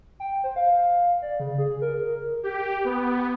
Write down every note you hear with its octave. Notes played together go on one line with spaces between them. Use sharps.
G5
C5
F5
D5
C#3
G#4
A#4
G4
B3